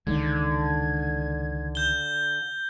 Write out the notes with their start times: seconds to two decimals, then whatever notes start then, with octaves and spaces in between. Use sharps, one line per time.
0.07 C#2 D3 D#3 G#3 G#6
1.75 G6 G7